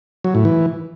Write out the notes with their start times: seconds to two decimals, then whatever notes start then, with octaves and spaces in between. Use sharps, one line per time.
0.24 F#3
0.35 A2
0.45 E3